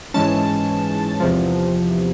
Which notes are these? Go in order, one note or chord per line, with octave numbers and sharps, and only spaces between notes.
G#2 E3 G#3 C#4 A5
E2 C3 F3